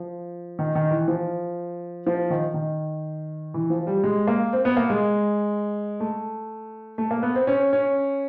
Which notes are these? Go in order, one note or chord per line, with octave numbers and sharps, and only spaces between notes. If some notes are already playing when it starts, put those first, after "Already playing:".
Already playing: F3
D#3
D#3
E3
F3
F3
D#3
D#3
E3
F3
G3
G#3
A#3
C4
B3
A#3
G#3
A3
A3
A#3
B3
C4
C#4
C#4